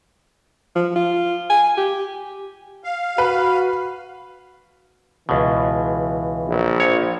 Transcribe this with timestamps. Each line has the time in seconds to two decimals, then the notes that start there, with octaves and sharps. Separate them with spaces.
0.75 F3
0.96 F4
1.50 G#5
1.77 G4
2.84 F5
3.18 F#4 B4
5.29 C#2 B2 E3
6.48 A#1
6.80 F3 C#5